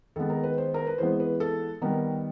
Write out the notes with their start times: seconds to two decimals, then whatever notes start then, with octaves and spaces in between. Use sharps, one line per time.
0.16 D#3 G#3 B3 A4
0.30 A#4
0.43 B4
0.58 C5
0.74 A#4
0.87 B4
0.98 E3 G#3 B3 C5
1.20 B4
1.40 A4
1.81 D#3 G3 B3 A#4